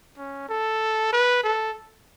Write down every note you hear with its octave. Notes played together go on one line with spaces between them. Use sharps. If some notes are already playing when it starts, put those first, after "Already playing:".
C#4
A4
B4
A4